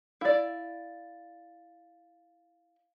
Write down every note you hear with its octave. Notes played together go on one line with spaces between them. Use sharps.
E4 D5 F5 A6